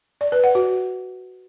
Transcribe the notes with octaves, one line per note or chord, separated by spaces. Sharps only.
D5
B4
F#5
F#4